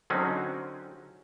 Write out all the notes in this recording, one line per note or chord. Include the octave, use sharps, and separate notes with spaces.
D3 F#3 C4 C#4 D#4